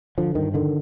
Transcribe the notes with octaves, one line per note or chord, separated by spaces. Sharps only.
D3 F3
G2 D#3
D3 D#3